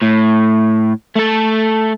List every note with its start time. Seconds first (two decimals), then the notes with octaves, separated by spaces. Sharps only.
0.02 A2
1.16 A3 A4